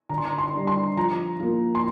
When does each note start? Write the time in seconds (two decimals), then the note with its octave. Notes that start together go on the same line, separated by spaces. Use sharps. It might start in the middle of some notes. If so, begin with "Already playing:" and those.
0.09 D3 A#5
0.18 C6
0.25 A#5
0.38 C6
0.53 G3 D4
0.67 C6
0.97 F3 A#5
1.40 A#3 F4
1.75 C6